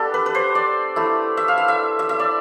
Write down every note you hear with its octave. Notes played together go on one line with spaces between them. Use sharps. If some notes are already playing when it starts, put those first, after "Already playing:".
Already playing: B3 D4 G4 A4
B4
B4
C5
D5
A3 E4
E5
F5
E5
E5
E5
E5
D5